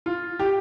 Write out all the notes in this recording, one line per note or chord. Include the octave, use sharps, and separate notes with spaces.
F4
G4